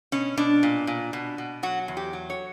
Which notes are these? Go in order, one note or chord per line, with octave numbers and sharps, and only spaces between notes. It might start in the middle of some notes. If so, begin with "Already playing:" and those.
B2 C#4
B2 D4
A#2
A#2
B2
B2
F#3 F#4
E2
G4
F#3
C#5